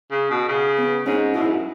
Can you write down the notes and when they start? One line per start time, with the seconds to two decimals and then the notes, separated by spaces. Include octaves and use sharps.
0.11 C#3
0.31 B2
0.49 C#3
0.78 B3
1.06 G#2 C#4
1.34 B2 E4
1.42 G#2
1.49 F#2